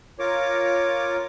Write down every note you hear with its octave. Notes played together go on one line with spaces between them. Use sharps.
F4 A#4 C#5 D6